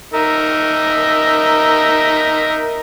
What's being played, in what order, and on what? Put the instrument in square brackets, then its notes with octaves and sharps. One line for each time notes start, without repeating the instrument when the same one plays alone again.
[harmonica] D#4 A#4 E5